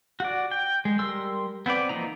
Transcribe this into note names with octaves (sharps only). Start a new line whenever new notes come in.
F#4 D5
G5
G#3
G3 A#4 C6 E6
B3 C4 B4 D5
E3 F3 A#3 D#4 A#5